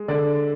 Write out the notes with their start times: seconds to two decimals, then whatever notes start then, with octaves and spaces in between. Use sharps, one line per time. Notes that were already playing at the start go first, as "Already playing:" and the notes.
Already playing: G#3
0.08 D3 D5